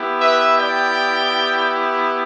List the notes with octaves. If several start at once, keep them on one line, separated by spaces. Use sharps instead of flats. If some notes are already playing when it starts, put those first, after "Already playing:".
Already playing: B3 E4 G4
B4 E5
D5 G5